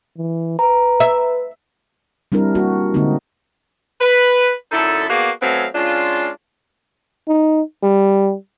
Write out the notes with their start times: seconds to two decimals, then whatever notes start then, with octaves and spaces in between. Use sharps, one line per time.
0.17 E3
0.59 B4 A#5
1.00 E5
2.32 G3 C4 D4 E4 A#4
2.55 G3 A#3 F#4
2.94 D3 G#3 A#3 C4 D#4
4.01 B4
4.71 F#2 D3 D#4 E4 A4
5.10 A#3 B3 F#4 G#4 D5 F5
5.41 F#3 A3 B3 C4 F5 G#5
5.75 G#3 C#4 D4 F4
7.28 D#4
7.83 G3